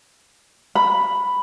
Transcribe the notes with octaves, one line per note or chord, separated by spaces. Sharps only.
B5